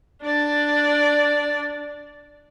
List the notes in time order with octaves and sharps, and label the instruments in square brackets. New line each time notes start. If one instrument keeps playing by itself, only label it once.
[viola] D4 D5